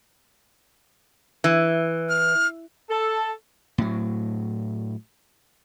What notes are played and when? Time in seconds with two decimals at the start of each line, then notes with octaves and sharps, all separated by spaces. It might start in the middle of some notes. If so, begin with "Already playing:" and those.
1.44 E3
2.09 F6
2.90 A4
3.78 A2 F#3